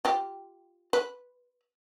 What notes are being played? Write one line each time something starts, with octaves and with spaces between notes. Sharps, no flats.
F4 G4
B4